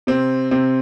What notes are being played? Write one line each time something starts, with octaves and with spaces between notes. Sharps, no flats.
C3 C4
C3 C4